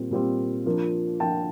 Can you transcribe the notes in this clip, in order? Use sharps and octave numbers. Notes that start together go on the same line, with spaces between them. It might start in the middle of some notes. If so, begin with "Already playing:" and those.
Already playing: A#2 G3 C4
A#2 G3 C4
F3 A#3 D4 F4
F3 A#3 D4 F4 G5 A5